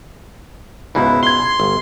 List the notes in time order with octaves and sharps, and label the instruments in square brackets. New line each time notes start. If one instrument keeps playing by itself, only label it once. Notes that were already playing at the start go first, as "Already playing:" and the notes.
[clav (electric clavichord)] C#2 G#2 B2 [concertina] E4
[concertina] C6 [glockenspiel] G#6 G7
[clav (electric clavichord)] G1